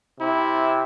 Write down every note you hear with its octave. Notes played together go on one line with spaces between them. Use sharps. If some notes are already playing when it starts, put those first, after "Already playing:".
C3 E4